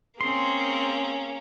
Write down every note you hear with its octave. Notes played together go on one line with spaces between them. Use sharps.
A#3 C4 C#4 G#4 C6